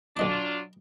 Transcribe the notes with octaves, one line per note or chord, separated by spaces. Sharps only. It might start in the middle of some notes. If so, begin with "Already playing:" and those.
B1 F#3 D4 F4 D#5 D6